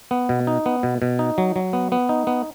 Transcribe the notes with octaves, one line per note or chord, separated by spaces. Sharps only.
B3
B2
D#4
B3
B2
B2
D#4
F#3
F#3
B3
B3
D#4
B3